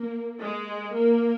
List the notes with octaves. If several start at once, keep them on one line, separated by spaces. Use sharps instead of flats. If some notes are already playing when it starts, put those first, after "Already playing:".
Already playing: A#3
G#3
A#3